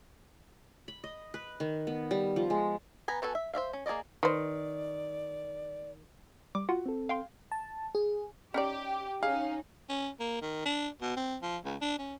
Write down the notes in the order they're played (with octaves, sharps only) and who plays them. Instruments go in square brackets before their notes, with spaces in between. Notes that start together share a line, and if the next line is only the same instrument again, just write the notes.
[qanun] B5
D#5
B4
D#3
B3
G3
F3
G#3
[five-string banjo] B3 G#5 A#5 B5
B3 F#4 A4 C5 G#5
E5
C5 D5 E5 F5
C#4
A#3 G#4 B4 D5 D#5
[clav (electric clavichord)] D#3 [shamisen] B4 C5 [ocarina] D5
[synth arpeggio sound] G3 D6
F4 F#4 F#5
[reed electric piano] C4 A4
[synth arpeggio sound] F5 G5 C6
[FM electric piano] A5
G#4
[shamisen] C#4 D#4 D5 [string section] G4
[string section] C#4 D#4 [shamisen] G#4 [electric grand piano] F5
[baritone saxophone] C#4
A#3
D#3
D4
B2
C4
F3
C#2
D4
C#4